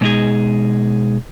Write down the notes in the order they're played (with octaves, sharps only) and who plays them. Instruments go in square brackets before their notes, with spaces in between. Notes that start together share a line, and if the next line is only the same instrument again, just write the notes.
[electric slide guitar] B2 G#3 D#4 G#4